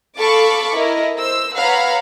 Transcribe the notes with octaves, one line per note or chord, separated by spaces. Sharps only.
A4 F5 A5 B5 C#6 D6
E4 A#4 D#5
C5 E6
B4 C#5 F5 F#5 A#5 B5